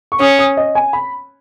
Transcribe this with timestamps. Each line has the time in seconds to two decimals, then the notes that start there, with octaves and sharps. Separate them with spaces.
0.12 C#6
0.20 C#4 D#6
0.39 D#6
0.57 D#5
0.75 G#5
0.93 B5